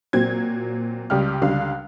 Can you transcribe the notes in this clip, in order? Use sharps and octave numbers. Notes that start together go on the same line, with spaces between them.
A#2 F#3 C4 G#6
C#2 G3 G4 F6
C#2 D3 G3 F5